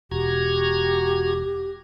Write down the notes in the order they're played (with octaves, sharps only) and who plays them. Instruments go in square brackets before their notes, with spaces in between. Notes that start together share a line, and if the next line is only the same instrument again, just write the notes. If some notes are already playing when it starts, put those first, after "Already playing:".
[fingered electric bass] E1 [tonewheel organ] F#4 A#5 G#6 [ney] G4